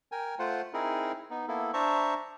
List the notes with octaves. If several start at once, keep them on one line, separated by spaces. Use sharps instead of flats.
A#4 G5 G#5
A3 F4 C5 F#5
C4 D#4 E4 G#4 A#4
B3 D#4
A#3 B3 E4 A4
D4 C5 E5 A5 A#5 C#6